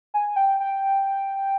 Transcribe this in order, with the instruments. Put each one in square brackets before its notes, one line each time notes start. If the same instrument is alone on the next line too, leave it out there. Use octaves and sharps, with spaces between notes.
[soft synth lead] G#5
G5
G5